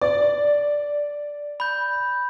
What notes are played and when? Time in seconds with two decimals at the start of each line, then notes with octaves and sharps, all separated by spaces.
0.01 D5
1.60 B5 G6